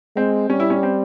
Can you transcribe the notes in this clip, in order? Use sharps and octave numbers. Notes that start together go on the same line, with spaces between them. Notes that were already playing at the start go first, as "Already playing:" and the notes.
G#3 C4
G3 C#4
E4
C#4
C4